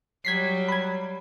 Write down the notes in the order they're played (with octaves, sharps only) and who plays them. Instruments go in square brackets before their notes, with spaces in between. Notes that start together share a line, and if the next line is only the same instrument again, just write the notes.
[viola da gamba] F#3 G3 [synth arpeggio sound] G#6 B6 C7
[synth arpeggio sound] B5 G#6